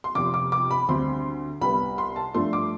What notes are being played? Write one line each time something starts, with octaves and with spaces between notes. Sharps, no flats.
C6
F1 F2 C3 F3 D6
D6
D6
B5
D2 D3 G3 C4 C6
C2 C3 G3 B3 B5
C6
A5
G2 F3 A3 D4 C6
D6